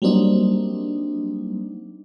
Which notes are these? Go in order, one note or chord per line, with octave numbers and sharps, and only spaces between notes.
F#3 G3 A#3 C4 D4 D#4